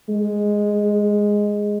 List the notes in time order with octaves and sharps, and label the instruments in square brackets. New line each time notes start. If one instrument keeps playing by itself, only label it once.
[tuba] G#3